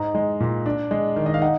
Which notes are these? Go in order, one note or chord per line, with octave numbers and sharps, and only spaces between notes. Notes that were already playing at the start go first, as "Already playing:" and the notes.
Already playing: G#2 D#4 A#5
G#3
A#2
D4
G#3
D#3
D#5
F5
D#4 F#5